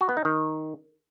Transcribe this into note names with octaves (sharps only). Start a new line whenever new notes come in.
F#4
B3
D#4
D#3